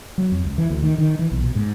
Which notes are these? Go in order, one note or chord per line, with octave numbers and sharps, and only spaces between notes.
F#3
F2
C#2
E3
D2
D#3
D#3
E3
B1
B2
G#2